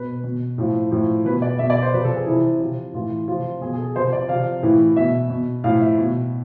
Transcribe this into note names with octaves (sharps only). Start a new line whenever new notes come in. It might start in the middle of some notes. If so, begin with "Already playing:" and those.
Already playing: B2 B4
B2
A2 F3
A2 F3
B2 B4
D5
B2 E5
D5
C5
C3 F3 B4
A4
G#4
C3 E3 E4
C3 F3
A2 E3 F4
C3 F3 F4
B2 G#4
G#4
A4
C3 F3 C5
D5
C3 F3 F5
A2 E3
B2 E5
B2
A2 F3 F5
E5
B2